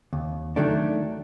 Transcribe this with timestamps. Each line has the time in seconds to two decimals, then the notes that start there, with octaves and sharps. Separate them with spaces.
0.13 D#2
0.56 D#3 F#3 A3 D4